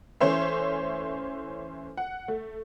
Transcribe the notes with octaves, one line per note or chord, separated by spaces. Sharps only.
E3 A3 C#4 C5 C#5 E5
F#5
A3